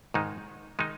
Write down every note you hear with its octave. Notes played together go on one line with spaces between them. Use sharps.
G#2 D#3 G#3 D#4
D#3 G#3 D#4